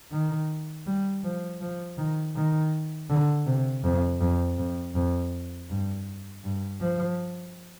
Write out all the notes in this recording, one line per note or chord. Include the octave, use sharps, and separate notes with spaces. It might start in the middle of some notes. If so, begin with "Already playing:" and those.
D#3
G3
F3
F3
D#3
D#3
D3
C3
F2
F2
F2
F2
G2
G2
F3